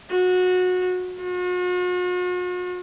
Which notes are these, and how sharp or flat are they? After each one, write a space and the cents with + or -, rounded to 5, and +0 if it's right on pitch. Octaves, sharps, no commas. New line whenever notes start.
F#4 -20
F#4 -45